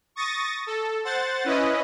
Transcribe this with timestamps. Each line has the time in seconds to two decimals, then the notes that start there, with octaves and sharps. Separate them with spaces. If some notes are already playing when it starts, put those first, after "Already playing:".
0.16 C#6 D#6 A6 A#6
0.67 A4
1.05 C5 F#5 A6
1.44 C#4 E4 B4 D#5